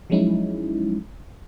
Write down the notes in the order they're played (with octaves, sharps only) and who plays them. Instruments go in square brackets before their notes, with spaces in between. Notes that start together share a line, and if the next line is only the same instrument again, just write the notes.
[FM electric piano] F3 F#3 G#3 C#4 D#4 E4